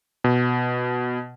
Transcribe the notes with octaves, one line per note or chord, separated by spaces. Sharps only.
B2